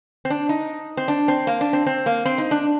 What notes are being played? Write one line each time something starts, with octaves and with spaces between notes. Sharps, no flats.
C4
D4
D#4
C4
D4
C4
A#3
D4
C4
C4
A#3
C4
D#4
D4